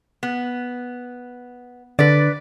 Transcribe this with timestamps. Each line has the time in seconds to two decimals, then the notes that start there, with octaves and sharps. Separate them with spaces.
0.23 B3
1.99 D3 B4 D5